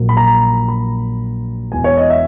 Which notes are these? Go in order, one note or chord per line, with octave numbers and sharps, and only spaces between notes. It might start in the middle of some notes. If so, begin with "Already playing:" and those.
Already playing: A#1 A#2 F#3
B5
A#5
B5
E1 E2 B2 G#5
C#5
D#5
E5